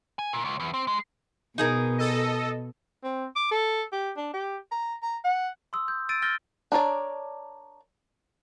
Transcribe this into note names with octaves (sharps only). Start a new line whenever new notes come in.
G#5
A#2
C#2
E2
C4
G#3
B2 D#4 G#4 A#4
A4 D#5
C4
D6
A4
G4
D4
G4
A#5
A#5
F#5
C6 D#6 E6
G6
E6 A6 D7 D#7
E6 F6 G6 A6 A#6 G7
D4 A#4 C#5 D5